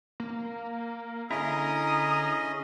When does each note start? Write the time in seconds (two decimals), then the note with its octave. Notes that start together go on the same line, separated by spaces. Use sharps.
0.20 A#3
1.31 D3 C#4 E4 G#4 D#5 A#5 D#6